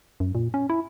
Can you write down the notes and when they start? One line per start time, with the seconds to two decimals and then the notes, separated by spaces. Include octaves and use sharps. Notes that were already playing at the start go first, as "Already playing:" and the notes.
0.20 F#2
0.35 A#2
0.54 C#4
0.70 E4